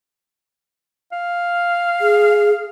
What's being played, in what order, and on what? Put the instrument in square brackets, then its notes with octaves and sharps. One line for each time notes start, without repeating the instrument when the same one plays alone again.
[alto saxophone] F5
[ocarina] G#4